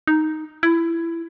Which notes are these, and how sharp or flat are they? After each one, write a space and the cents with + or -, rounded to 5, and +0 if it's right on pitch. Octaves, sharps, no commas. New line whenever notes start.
D#4 +0
E4 +20